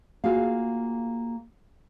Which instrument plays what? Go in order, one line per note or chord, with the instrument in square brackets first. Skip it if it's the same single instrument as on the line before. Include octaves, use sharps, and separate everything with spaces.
[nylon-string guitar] A#3 F4 F#4 G#4 F5